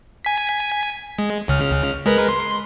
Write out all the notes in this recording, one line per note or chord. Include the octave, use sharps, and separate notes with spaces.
G#5 B6
G#3
C#2 C#3 F6
G#3 A#4 B4
C6